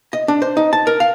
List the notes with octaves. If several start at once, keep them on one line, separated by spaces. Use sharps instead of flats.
D#5
D4
C5
D#4
A5
A#4
F5